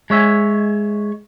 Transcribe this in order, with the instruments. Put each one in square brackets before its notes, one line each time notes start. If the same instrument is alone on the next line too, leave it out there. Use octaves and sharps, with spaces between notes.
[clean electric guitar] G#3 C#5 E5 G#5